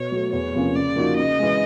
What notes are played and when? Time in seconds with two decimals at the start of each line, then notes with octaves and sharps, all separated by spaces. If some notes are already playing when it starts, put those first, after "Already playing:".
Already playing: B2 C#5
0.12 F#3 A3
0.33 E2 C#5
0.54 C3 F3 A#3 C#4
0.75 C#3 D5
0.96 F3 A#3 D#4 F#4
1.17 C#3 D#5
1.39 E3 G#3